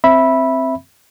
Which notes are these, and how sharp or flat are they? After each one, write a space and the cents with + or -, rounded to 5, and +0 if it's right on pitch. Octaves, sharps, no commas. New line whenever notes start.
C4 +5 E5 +0 B5 -10